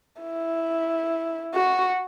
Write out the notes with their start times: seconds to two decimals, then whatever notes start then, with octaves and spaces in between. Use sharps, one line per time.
0.22 E4
1.55 F#4